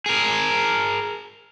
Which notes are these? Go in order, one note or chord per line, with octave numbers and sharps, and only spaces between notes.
G#4 A#4